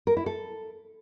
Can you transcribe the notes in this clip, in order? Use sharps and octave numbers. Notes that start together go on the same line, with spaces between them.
A#4
E4
A4